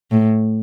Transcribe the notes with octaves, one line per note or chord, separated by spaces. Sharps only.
A2